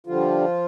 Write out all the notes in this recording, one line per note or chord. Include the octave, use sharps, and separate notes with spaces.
D3 F3 G3 F4